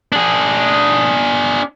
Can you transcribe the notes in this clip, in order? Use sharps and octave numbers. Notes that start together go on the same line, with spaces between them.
D4 G#4